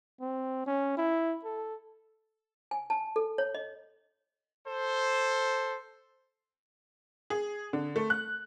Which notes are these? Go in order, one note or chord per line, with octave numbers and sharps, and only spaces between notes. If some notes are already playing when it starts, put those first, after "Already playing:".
C4
C#4
E4
A4
G#5
A5
A4
C#5
D#5
A4 C5
G#4
D3
A3
F#6